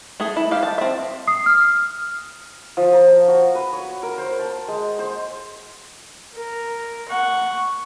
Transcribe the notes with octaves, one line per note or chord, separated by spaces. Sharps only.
A3 G#4
E4
G4 F5
A5
C4 E5
D#6 C7
F6
F3
A#5
F#4
B4
C#5
A#4
C5
A5
G#3
C5
A#4
F#5 C#6